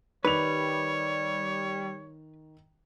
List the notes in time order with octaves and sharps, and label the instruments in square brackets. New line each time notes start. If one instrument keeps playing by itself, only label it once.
[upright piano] D#3 F7 [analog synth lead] G3 [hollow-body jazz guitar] B4 [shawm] C#5